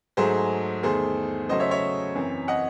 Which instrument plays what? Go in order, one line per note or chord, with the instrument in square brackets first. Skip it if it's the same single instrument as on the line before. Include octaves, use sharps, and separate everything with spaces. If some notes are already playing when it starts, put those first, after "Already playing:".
[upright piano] G#2 F#3 A3 G#4 C5
E2 D#3 A3 G#4 C5
C#3 F#3 A3 C5 D#5
C#5 E5
C#5 E5
F#2 E3 C4
D#5 F#5